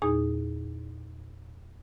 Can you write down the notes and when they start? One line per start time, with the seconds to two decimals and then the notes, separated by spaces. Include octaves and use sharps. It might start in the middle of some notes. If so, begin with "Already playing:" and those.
0.02 E2 A#2 D#4 G#4 D#6